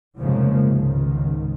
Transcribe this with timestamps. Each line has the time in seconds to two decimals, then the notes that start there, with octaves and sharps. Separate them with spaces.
0.18 F1 G#2 C#3 F3 G#3 A#3
0.72 C#2 G#2 D#3